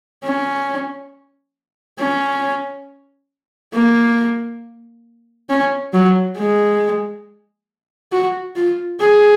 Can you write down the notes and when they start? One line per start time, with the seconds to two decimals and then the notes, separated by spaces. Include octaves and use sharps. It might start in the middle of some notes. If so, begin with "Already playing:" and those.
0.24 C#4
1.99 C#4
3.74 A#3
5.50 C#4
5.94 F#3
6.37 G#3
8.12 F#4
8.56 F4
9.00 G#4